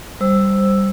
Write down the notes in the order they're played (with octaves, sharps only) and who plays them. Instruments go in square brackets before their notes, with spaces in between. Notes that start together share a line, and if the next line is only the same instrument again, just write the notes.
[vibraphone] G3 C5 E6